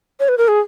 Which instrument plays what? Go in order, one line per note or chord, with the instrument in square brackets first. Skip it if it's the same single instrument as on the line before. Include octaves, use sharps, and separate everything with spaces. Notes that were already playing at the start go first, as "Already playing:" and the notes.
[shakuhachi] C#5
B4
A#4
G#4